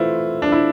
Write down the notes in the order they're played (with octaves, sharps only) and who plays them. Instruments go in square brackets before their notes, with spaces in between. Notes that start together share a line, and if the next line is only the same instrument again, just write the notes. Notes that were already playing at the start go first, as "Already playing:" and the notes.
Already playing: [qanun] E3 A3 C4 [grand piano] E4 F4
[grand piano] D4
E4